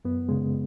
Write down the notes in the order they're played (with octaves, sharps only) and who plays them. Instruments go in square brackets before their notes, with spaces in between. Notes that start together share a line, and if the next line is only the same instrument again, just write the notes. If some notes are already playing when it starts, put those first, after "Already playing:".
[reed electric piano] F#2 B3
C#3 G#3